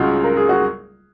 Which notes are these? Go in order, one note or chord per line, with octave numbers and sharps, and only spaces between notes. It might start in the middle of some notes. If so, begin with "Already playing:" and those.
Already playing: C#2 C#3 G#3 F4 F#4
A#4
G#4
F#4